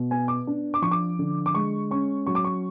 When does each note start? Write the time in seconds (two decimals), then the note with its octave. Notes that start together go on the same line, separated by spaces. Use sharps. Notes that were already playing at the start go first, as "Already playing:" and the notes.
Already playing: B2
0.11 B3 G#5
0.28 D6
0.47 D4
0.74 D6
0.82 F3 C#6
0.91 D6
1.19 D3
1.46 D6
1.55 G#3 C#6
1.91 C#4 C#6
2.27 F#3 C#6
2.35 D6
2.45 C#6